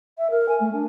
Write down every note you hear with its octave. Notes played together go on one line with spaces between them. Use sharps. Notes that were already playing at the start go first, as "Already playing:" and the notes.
E5
A#4
G#5
A3
D4